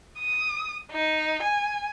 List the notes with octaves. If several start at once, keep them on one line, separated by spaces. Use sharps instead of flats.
D#6
D#4
G#5